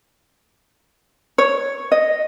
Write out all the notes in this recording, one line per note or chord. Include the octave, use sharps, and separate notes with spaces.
C#5
D#5